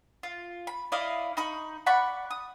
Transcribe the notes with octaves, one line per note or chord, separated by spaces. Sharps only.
F4
B5
E4 D5 D#5 F5
D#4 B5 C#6
D5 F#5 B5 C#6
D#6